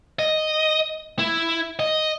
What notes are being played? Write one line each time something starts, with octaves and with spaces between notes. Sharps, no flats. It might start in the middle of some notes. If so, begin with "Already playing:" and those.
D#5
E4
D#5